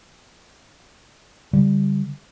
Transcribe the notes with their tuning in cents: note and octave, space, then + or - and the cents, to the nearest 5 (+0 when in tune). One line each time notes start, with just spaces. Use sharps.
D3 -35 G3 +0